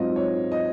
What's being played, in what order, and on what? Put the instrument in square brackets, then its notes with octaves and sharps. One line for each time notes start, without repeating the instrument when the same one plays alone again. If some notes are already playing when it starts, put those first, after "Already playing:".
Already playing: [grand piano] G#2 F#3 C4 F4 D#5
C#5
D#5